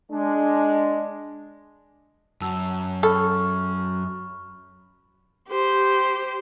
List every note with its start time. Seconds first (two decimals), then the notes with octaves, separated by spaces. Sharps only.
0.12 G#3 D4
2.41 F#2 A5 E6
3.03 A4 B5 C#6 F6
5.48 G4 C5